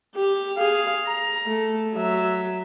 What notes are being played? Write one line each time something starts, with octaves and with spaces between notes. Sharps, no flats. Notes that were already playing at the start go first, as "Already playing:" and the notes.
G4
G#4 F5
A#5
A3
F#3 E5